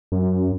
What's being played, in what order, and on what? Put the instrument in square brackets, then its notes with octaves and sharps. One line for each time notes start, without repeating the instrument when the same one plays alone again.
[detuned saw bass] F#2